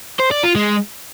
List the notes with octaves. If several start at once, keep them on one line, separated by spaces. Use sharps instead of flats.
C5
D5
F4
G#3